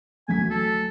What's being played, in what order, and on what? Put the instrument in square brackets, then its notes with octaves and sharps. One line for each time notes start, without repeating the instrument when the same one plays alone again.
[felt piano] D2 F#3 B6 [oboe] G#5
[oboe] A4